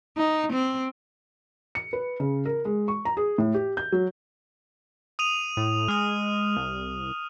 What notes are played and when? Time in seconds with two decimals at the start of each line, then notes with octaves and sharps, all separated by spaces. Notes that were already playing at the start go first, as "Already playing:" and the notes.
0.17 D#4
0.53 C4
1.75 C#7
1.93 B4
2.20 C#3
2.46 A#4
2.65 G#3
2.88 C#6
3.05 A#5
3.17 G#4
3.38 A2
3.54 G4
3.77 G6
3.92 F#3
5.19 D#6 D#7 F7
5.57 A2
5.88 G#3 D#6 F6
6.57 C2